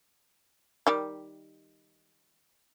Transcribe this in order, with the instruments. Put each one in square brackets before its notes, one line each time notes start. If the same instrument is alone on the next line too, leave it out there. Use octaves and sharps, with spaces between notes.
[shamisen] D#3 G3